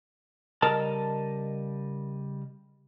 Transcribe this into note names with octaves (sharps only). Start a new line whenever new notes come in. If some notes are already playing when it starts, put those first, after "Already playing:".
C#3 G3 A#4 D#5 A5